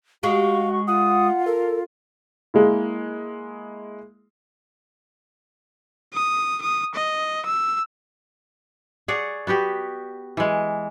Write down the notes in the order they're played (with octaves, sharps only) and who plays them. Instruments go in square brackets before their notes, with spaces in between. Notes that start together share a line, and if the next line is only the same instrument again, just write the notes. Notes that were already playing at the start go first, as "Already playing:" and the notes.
[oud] G#3 G4 [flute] F#4 [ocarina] F5 [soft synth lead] C#6
[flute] F4 [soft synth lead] F#5 [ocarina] D#6
[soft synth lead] A4 [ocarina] A#4
[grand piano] G#3 A#3 E4
[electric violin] D#6
D#6
D#5
E6
[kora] G#4 C#5 D5 F#5
B3 F#4 G4 B4
E3 G#3